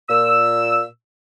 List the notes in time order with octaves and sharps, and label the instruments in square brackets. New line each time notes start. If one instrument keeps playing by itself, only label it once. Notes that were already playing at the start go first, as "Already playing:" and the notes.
[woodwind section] A#2 E6